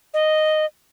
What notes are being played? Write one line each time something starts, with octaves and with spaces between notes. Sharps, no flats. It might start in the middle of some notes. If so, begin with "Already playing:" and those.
D#5